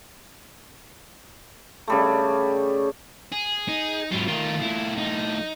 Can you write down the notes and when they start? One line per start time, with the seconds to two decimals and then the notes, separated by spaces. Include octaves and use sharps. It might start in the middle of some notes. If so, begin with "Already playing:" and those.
1.88 C#3 G3 A3
3.32 G#4
3.69 D#4
4.12 G#2 F#3 E4 F4
4.28 A2 D#3 F4 A#4
4.62 E4
4.98 D#4